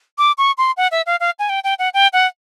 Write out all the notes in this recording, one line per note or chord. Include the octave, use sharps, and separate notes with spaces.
D6
C#6
C6
F#5
E5
F5
F5
G#5
G5
G5
F#5
G5
F#5